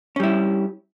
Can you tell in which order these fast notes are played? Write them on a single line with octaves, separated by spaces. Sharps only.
C#4 G3 E4